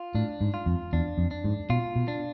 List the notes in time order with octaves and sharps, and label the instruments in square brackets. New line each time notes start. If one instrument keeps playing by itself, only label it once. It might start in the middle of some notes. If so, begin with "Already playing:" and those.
Already playing: [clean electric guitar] F4
[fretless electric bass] A2 [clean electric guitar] D4
[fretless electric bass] G#2
[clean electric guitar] F4
[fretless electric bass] F2
[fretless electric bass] E2 [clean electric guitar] D4
[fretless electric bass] F2
[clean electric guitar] D4
[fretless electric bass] G#2
[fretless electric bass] B2 [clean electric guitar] F4
[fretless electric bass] B2
[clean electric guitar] D4